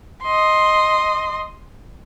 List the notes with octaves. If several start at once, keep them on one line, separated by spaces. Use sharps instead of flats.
D#5 C6